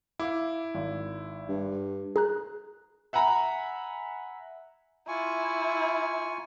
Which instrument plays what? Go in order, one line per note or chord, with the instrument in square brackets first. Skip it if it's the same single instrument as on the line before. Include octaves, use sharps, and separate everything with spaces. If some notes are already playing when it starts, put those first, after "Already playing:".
[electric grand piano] E4 [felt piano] F5 D6
[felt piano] G#1
[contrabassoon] G2
[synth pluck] G#4 A#5 F#6
[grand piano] E5 F#5 G#5 A#5 B5
[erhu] E4 [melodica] F4 G#5 C#6